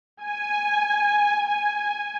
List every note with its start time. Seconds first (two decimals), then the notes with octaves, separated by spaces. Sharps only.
0.24 G#5
1.47 G#5